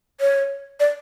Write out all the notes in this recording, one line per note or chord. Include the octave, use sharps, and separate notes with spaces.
C#5
D5